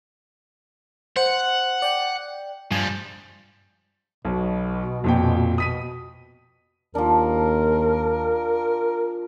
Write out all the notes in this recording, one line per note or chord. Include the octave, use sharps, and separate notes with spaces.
C5 F#5
D5 G5
G2 F3 G3 G#5
B1 B2
F2 A#2 G5
B2 D#6 B6 D#7
D#2 F3 D4 A#4